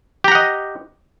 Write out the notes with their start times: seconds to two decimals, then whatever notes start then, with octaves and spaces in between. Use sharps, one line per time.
0.24 G4
0.28 A#5
0.32 F#5
0.35 D#5